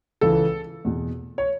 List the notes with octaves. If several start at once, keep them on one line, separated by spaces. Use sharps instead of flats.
C#2 C#3 E3 A4
E2 B2
C#5